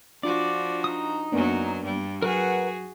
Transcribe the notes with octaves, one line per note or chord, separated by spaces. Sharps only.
F3 D4 F4 F#4 D5
D#4 D#6
F#2 F#3 A#3 B3 D4
G2 G3
F#3 F#4 G#4 A#4 B4 F#5